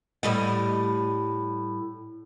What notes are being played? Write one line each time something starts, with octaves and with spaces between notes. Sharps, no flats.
A2 G3 D#5